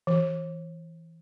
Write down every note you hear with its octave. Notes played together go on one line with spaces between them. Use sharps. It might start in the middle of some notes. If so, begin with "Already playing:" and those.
E3